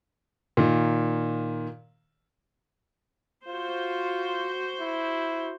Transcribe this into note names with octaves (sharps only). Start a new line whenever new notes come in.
A#2 D#3
F4 F#4 C5
E4